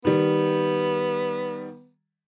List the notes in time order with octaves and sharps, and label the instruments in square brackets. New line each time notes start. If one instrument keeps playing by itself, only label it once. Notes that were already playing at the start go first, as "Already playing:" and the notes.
[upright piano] D#3 G3 [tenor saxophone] B3